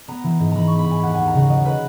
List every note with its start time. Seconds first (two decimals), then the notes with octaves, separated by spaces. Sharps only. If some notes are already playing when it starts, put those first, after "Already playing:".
0.08 B3 A#5
0.24 E3
0.39 G#2
0.51 E3 A#5 B5
0.67 B3 C#6
0.79 B5
0.87 G#2 G#5
1.03 D#2 F#5
1.14 D#2 G#5
1.27 A#5
1.34 C#3 F#5
1.49 F#3 D#5
1.65 B4